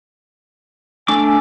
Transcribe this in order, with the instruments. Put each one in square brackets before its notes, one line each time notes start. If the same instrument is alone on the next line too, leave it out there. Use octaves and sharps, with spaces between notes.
[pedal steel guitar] A3 D4 D6 [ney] G#5